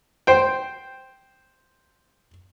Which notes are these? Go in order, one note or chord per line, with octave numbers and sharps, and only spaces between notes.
C5 G5